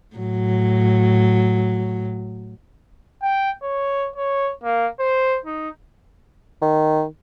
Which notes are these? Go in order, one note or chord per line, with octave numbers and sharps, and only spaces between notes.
A2 F#3
G5
C#5
C#5
A#3
C5
D#4
D#3